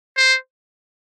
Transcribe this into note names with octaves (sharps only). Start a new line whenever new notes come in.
C5